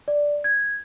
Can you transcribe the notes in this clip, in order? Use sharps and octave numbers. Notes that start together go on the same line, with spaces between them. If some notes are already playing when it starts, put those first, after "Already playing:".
D5
G#6